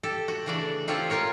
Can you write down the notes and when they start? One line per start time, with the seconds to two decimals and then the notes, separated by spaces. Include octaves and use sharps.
0.03 G4 A4
0.28 F#4
0.46 C#3 E3 A3 D4 D5
0.88 C4 F4 G4 A4 C5 C#5
1.10 C#4 F4 A#4 C#5